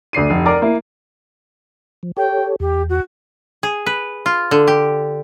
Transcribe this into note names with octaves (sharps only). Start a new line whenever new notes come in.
D2 D5 C7 D#7
F1
A#4 D5 D6
A#3 E4
F3
G4 A4 C#5 G5
E2 G4
F#4
G#4
B4
F4
D3
G4